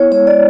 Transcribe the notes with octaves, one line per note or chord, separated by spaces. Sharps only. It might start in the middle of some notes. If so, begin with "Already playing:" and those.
Already playing: B3 E4 C#5
G#3 C#5
D5